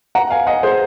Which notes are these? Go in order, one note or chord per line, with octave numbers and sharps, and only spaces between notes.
F#5 A#5
F5 G#5
D#5 F#5
G#4 C5